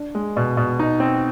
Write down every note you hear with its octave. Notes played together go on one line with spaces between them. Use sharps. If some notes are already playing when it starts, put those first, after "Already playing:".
Already playing: D4
G#3
B2
B2
D#4
C4